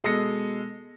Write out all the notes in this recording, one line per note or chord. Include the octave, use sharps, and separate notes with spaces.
B2 G#3 A4 D#6 A#6 C#7